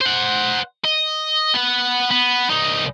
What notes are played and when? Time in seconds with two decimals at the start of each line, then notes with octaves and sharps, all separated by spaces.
0.01 C5 F#5
0.85 D#5
1.54 B3 F#5
2.11 B3
2.50 C2 D#4